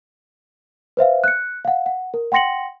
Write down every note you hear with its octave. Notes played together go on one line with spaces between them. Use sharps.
B4 C5 E5 F5
F#6 C#7
F5 F#5
F#5
A#4
F#5 G5 C6 A#6 C#7 F#7